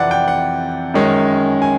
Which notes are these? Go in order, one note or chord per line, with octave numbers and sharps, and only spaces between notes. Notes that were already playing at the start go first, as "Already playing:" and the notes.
Already playing: F2 C3 E3 D5 F#5
G5
F#5
F#2 D#3 G#3 C#4
G#5